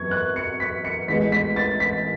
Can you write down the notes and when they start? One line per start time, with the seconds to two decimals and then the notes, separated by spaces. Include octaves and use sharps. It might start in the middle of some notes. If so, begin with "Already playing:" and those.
Already playing: F#2 E3 B3 C#6 G#6
0.11 F#6
0.36 C#7
0.60 B6
0.85 C#7
1.08 A1 A2 E3 G#3 B3 B6
1.32 B6
1.56 A6
1.80 B6